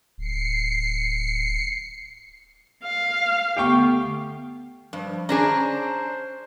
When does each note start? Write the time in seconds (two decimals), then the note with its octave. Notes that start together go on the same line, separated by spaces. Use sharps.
0.18 D1 C7 C#7
2.84 F5
3.56 D3 A3 B3 G4 G5 C#6
4.93 G2 F3
5.29 C#4 D4 G#4 C5 A#5